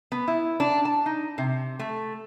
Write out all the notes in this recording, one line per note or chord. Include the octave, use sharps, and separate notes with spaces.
B3
E4
D4
A5
D#4
C3
A3